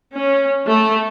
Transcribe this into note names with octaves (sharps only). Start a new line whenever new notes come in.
C#4
A3